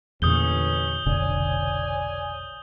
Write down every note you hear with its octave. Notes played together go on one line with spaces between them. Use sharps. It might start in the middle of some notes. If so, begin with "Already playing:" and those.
A1 E2 A#2 D3 C#4 D#6 G6 G7
F1 B1 D3 C#5 D5 G#5